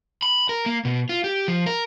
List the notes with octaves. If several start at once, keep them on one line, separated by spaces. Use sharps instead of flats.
B5
A#4
A#3
B2
F4
G4
F3
A#4